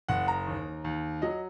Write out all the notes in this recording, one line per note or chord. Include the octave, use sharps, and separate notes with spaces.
F#1 F#5
A#5
D#2
D#2
F#3 D#5